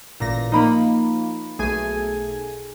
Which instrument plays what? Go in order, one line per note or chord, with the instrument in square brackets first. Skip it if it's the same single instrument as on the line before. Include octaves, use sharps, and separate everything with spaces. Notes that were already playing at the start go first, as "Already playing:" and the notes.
[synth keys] A1 A#6 [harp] A#2
[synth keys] F3 A#3 [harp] D#4 B5
[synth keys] B1 A3 G#5 [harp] G#4